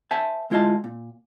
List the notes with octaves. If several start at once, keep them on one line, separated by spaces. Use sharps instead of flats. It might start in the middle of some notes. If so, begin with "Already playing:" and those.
C5 E5 G#5 A5
D2 G#3 E4 F4 D#5 A5
A#2